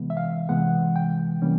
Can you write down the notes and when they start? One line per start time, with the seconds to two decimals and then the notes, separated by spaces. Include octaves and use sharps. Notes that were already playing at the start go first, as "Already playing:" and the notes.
Already playing: C3 E3 G#3 B3
0.10 E5
0.17 F5
0.49 C3 E3 G#3 B3 F#5
0.96 G5
1.42 C3 E3 G3 A#3 C#4